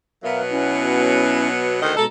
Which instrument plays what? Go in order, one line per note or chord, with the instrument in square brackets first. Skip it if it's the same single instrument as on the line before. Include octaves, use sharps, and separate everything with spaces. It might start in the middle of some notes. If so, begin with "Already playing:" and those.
[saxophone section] B2 F#3 B3 [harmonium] A#4 E5 F5
[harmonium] C#4 E4
[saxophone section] D2 D#3 D#5
[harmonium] B2 G#3 A#5 [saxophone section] A4